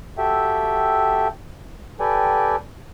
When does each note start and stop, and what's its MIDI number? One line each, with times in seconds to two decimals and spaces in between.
0.18 1.28 66
0.18 1.28 67
0.18 1.28 69
0.18 1.28 76
0.18 1.28 79
2.00 2.56 67
2.00 2.56 69
2.00 2.56 71
2.00 2.56 74
2.00 2.56 79
2.00 2.56 80